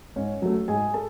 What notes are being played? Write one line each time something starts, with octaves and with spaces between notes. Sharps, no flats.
G#2 C#4 C#5
F#3 A3
G#2 G#4 G#5
A4 A5